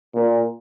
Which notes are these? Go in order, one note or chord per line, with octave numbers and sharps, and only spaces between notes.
A#2